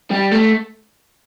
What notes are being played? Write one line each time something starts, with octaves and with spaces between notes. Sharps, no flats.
G3
A3